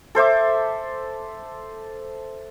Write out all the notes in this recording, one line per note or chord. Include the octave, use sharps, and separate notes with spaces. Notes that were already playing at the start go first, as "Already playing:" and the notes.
A4 C5 E5 D6